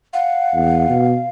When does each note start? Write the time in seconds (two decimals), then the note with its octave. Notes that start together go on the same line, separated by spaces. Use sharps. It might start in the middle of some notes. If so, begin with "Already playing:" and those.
0.13 F5 F#5
0.54 E2
0.89 B2